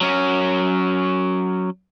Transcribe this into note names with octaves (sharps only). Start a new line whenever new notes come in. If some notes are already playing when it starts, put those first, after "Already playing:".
F#3 C#4